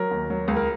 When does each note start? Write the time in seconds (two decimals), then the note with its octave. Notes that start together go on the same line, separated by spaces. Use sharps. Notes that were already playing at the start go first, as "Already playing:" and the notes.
Already playing: F#3 A#4
0.11 D#2
0.30 F#3
0.48 C#2
0.56 A#4